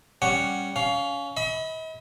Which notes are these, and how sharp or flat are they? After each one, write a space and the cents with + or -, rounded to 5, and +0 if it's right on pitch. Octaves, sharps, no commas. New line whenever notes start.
G3 +0 C#4 +0 F#5 +0
C#4 +25 F5 +5
D#5 +45 B5 +0